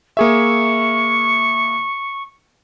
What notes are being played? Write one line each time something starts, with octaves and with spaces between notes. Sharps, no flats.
A#3 G#4 E5 C#6